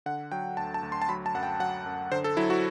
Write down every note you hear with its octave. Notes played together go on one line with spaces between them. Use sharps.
D3 F#5
F#3 G5
D2 A5
A5
D2
C6
A5
F#3 B5
A5
F#2 F#5
G5
F#3 F#5
F#2
D3 C5
A4
F#3 E4
F#4